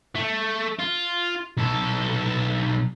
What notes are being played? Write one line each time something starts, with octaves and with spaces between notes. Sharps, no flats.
A3
F4
B1 A4